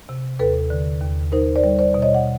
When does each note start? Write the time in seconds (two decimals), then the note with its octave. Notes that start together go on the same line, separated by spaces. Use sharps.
0.09 C3
0.39 D#2 A4 B4
0.70 D3
1.01 D#2
1.32 D#4 A#4 C5
1.56 C5 D5
1.64 G3
1.79 C5 D5
1.94 B2
2.02 C#5 D#5
2.14 F#5